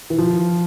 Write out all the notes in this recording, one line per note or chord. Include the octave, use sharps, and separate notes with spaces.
E3
F3